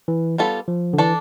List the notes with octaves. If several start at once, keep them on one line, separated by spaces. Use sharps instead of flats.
E3
G3 B3 F4 A4
F3
D3
E3 D4 A4 D5